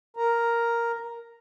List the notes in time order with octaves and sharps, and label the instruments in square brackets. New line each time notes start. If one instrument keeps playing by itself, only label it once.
[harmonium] A#4 A#5